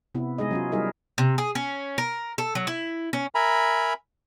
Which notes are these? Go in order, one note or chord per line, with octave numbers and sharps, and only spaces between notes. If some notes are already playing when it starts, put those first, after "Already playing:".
C3 B3 E4
G#3 D#4 G#4 D#5
F#3 C#4 F4
G3 D#4 E4 G#4 A#4 E5
C3
G#4
C#4
A#4
A4
F#3
E4
C#4
A#4 E5 G#5 A#5 B5